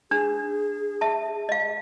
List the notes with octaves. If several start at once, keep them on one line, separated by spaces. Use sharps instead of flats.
D4 G#4
E5 A5
D#5 F5